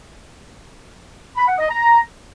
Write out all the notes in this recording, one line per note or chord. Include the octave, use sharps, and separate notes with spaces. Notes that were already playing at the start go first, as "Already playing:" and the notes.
B5
F#5
D#5
A#5